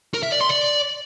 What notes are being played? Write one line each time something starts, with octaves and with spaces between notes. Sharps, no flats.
A#4
E5
D5
C6
D5